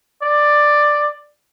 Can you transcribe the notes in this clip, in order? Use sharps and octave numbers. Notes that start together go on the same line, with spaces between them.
D5